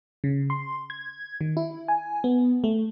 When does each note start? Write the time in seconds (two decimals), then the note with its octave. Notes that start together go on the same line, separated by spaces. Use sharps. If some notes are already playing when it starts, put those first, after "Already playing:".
0.24 C#3
0.50 C6
0.90 G#6
1.41 D#3
1.57 E4
1.88 G#5
2.24 B3
2.64 A3